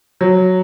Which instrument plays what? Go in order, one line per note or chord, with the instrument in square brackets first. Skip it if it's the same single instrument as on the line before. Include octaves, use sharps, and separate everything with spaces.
[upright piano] F#3